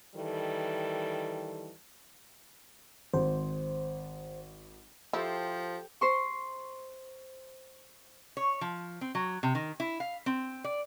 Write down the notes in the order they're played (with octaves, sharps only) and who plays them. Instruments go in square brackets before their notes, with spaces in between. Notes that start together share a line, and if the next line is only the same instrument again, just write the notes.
[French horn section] D#3 E3 G3 A4
[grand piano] G#1 [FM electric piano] C5
[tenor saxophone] F3 [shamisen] E4 [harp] G4 A4 C5
[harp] C5 C6 C#6
[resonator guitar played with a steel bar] C#5
F3
C4
F#3
C3
D#3
E4
F5
C4
D5